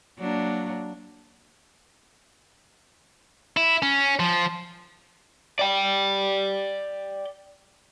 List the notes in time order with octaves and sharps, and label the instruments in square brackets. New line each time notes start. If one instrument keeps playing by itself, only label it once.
[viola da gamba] F#3 A#3 D4
[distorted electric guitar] E4
C#4
F3
[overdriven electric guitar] D5 G5